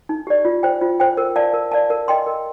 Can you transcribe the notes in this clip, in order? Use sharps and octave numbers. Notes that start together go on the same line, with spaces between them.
D#4
G4 D5
F4
C5 G5
F4
C5 G5
A#4
D5 F5 A5
A#4
D5 F5 A5
A#4
D#5 G5 C6
A#4